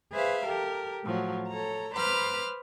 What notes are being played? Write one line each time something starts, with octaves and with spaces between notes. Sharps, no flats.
G#4 B4 C5 E5 F5
G4 A4 A#4
A2 F3 F#3
A4 C#5 A#5
B4 C5 A#5 B5 D6 F6